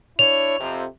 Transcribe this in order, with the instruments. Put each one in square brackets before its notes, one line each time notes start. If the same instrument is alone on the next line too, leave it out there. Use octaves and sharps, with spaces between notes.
[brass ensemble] D4 E4 C#5 [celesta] F7
[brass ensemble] F2 C3